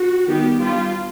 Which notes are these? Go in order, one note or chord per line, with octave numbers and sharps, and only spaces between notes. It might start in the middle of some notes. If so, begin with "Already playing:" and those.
Already playing: F#4
D#3 G3 B3 G4
G3 B3 D4 F4